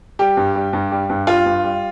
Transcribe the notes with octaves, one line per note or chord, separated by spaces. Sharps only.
G3 G4
G2
G3
G2
G3
G2
G3 F4
G2
G3